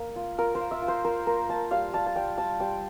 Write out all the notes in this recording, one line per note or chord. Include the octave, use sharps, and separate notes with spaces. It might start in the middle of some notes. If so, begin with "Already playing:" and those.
Already playing: A#3
F4
F4 A#4
C5
F4
E5
F4
C5
F4 A#4
A#3 A#4
A#3 A5
G3 F5
G3 A5
A5
G3 G5
G3 A5
G3 G5